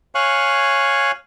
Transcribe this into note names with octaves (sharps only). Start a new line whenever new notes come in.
C#5 F5 G#5 C#6 F#6